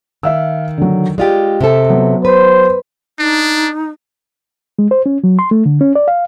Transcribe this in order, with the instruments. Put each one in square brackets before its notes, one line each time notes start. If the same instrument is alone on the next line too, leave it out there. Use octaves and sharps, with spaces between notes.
[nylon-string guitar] D#3 [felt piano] E5 F5 E6
[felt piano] D3 F#3
[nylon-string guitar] G#3 F4 G4 [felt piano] D5
[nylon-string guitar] C3 A4
[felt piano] F#3 B3
[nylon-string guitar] B4 [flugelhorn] C5
[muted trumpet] D4 [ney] D#4
[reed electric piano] G#3
C5
C#4
F#3
C6
A3
D3
C#4
D5
F5